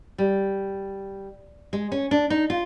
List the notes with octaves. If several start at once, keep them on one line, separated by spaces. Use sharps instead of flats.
G3
G#3
C#4
D4
D#4
F4